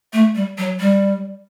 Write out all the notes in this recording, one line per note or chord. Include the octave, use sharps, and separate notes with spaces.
A3
G3
F#3
G3